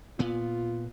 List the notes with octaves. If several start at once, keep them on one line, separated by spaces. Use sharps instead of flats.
A#2 B3 F4